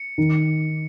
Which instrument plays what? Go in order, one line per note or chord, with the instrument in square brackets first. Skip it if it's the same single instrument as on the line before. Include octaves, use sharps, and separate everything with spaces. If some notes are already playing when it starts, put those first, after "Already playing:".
Already playing: [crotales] C#7
[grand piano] D#3